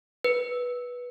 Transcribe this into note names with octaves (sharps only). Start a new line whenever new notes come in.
B4